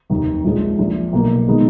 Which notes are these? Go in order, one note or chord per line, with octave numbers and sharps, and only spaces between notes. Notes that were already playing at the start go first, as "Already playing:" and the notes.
F1 D#2 D#3
A#1 A#2 F3 G#3
A#1 A#2 F3
B1 B2 A#3
D#3 G#3 B3 D#4